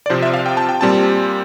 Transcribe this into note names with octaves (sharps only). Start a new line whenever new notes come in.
D5
C3 F3 C4 C5
E5
F5
G5
A5
G5
A#2 G3 C4 A5